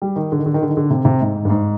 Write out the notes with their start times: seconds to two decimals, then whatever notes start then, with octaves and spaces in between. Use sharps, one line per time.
0.02 G3
0.16 D#3
0.32 D3
0.38 D#3
0.46 D3
0.54 D#3
0.62 D3
0.70 D#3
0.77 D3
0.90 C3
1.05 C3
1.21 G#2
1.45 G2
1.50 G#2